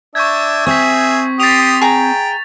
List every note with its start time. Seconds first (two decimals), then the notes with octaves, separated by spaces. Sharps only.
0.15 D4 E5 C#6 G6 G#6
0.66 C4 G#4 E5 C#6 B6
1.40 G4 C6 D#6 A6 F7
1.81 G#4 G5 A#5